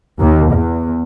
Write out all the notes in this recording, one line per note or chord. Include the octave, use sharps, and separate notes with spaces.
D#2
E2